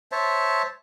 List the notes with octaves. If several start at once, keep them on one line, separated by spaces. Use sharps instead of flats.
C5 C#5 E5 A5